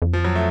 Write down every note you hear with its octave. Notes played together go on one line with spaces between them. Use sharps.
F2
F3
F#3
A3